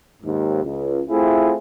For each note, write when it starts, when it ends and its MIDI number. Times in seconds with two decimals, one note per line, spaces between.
0.23 0.62 39
0.23 0.62 44
0.63 1.01 37
1.09 1.54 57
1.09 1.54 60
1.09 1.54 64
1.09 1.54 65
1.09 1.54 68